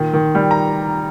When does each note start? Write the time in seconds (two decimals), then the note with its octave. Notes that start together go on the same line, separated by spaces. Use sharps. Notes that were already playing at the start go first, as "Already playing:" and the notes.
Already playing: A#2 D#3
0.13 D#3
0.35 G3
0.51 A#5